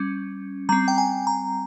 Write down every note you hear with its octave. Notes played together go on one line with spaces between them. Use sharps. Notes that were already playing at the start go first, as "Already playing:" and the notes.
Already playing: G3 C#4
G3 C4 A#5
G5
G#5
A#5